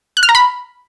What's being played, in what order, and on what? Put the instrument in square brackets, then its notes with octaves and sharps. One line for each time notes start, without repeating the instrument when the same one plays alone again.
[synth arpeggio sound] F#6
F6
A#5
B5